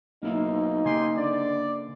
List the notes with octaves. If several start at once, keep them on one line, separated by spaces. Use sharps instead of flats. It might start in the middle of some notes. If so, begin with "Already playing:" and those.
B1 A#3 D#4 E4 F5
C#3 A#3 G4 G#5 C6
D3 D5